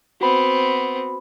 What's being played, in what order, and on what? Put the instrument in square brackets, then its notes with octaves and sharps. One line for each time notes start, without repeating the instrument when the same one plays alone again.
[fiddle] B3 C4 [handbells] F#4 B5